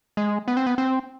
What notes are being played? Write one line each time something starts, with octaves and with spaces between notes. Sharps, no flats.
G#3
B3
C4
B3
C4